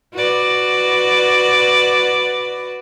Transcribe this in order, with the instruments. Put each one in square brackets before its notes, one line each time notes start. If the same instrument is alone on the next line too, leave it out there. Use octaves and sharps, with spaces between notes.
[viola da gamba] F#4 B4 D5